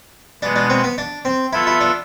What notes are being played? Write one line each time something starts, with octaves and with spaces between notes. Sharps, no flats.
B2 G#3 B3 D4
D4
C4
B3
D4
C4
B3 E4 F4 A4 E5
E4
D4